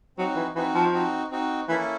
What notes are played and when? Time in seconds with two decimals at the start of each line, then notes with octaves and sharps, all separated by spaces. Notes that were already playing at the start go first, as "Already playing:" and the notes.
0.17 F#3 C4 D#4 F#4
0.36 E3
0.55 E3 C4 D#4 F#4
0.75 F3
0.93 C4 D#4 F#4
1.31 C4 D#4 F#4
1.69 E3 A#3 C#4 E4 A4